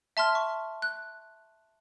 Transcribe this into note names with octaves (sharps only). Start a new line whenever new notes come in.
E5 A5 C6 F6
C#6
F#6